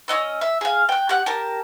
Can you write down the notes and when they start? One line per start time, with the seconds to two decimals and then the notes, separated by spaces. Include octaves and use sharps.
0.08 C#4 F4 D#5 E6
0.41 E5
0.61 G#4 F5
0.89 G5 F#6
1.09 G4 F#5
1.26 G4 A#4 A5